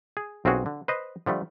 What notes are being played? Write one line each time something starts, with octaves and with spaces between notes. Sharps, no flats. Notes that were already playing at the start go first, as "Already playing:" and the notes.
G#4
B1 C4 C#4 F4 F#4 G#4
D3
B4 C5 D#5
D3 F3 G3 A3